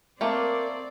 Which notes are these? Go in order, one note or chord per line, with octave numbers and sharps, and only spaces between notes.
A3 A#3 C4 A#4 D5